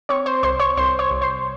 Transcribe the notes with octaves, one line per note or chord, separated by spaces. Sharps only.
C4 C#5 C#6
C5 C6
C2 C5 C6
C#5 C#6
C2 C5 C6
C#5 C#6
C2
C5 C6